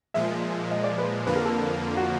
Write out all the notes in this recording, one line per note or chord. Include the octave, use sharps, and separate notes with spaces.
A#2 F3 G#3 E5
D#5
D5
B4
F2 D3 F3 A#3 B4
A#4
A4
F#4